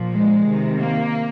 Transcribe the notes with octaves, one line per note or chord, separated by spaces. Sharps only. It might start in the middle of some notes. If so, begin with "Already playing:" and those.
Already playing: A#2 F3
G#3
C3 D#3
A#3